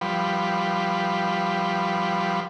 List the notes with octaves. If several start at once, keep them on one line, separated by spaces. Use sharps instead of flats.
F3 G3 B4